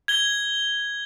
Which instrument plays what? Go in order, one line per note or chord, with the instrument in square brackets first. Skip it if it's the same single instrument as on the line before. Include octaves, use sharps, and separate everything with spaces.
[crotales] G#6 G7